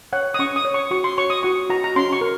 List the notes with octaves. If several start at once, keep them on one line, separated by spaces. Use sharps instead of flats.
C#5 F#5
D#6
C#4 C#6
D#6
C#5
C#6
F#4 C#6
C6
C#5 C#6
D#6
F#4 C#6
F#4 A#5
A#5
C#4 C6
C#6
A#4